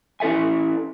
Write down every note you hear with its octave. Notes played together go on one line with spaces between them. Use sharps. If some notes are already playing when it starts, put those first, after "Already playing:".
C#4 E4 A4 E5 G#5